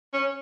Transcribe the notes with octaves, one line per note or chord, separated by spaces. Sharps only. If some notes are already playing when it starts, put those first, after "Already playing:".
C#4